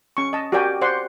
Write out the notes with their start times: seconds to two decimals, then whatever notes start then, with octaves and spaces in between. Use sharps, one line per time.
0.17 C#4 C#6
0.33 D#5 A5
0.52 F#4 G4 A#4 D5 G5 G#5
0.81 C5 D5 F#5 C6